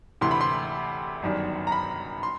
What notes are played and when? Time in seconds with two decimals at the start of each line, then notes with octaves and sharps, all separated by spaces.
0.21 D2 C3 E3 C6
0.31 B5
0.41 C6
1.22 G1 F#2 D#3 G3
1.67 A#5
1.72 B5
2.23 C6